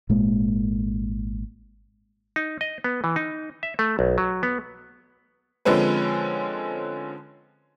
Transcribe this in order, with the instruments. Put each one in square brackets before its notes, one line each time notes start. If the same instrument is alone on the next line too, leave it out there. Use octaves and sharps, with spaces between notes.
[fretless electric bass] G#1 A#2 G#3 A#3
[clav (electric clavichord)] D#4
D#5
B3
E3
D#4
E5
A3
B1
F#3
B3
[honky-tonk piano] D3 F3 G#3 C4 C#4 B4